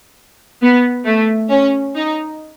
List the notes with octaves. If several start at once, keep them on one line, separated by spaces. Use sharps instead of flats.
B3
A3
C#4
D#4